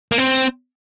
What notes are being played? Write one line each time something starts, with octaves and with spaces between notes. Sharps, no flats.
A#3
C4